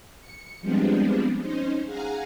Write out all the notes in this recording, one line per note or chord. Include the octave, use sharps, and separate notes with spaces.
C#7
F3 G3 G#3 B3 C4 D4
C#4 D#4 C5
G#4 F5 F#5 G#5 A#5